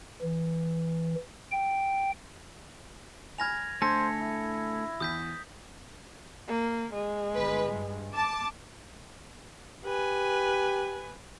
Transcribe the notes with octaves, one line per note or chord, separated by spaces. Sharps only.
E3
G5
G#5 B5 F6 G#6 A#6 F7
D3 A3 A4 C5 G#5 A#6
E4
E2 D#6 G6 B6
A#3
G#3
G1 B4
G2
A5 D6
G4 B4 G#5